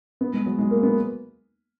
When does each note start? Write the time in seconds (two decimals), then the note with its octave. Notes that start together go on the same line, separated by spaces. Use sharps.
0.21 B3
0.33 G#3
0.46 F#3
0.58 G#3
0.71 A#3
0.83 B3